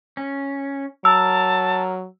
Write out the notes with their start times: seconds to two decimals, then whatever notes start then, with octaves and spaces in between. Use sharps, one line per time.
0.17 C#4
1.05 F#3 A#4 A5 E6